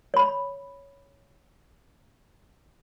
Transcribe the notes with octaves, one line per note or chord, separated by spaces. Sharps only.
C#5 B5